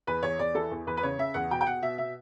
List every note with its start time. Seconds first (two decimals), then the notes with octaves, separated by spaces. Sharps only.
0.07 E2 B4
0.23 E2 C#5
0.39 E2 D5
0.54 E3 A4
0.71 E2
0.87 E2 B4
0.97 B4
1.03 C#3 C#5
1.18 C#3 E5
1.34 E2 F#5
1.51 B2 G5
1.61 G5
1.66 B2 F#5
1.82 B2 E5
1.98 B2 E5